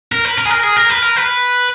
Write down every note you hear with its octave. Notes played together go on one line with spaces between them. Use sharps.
A#4
B4
A#4
G#4
A#4
G#4
A#4
B4
A#4
B4